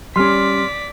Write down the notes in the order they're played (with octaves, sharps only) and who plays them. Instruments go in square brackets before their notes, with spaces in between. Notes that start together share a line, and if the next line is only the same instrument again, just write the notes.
[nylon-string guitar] G3 C#4 [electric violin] D5 B6 [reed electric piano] C6 F6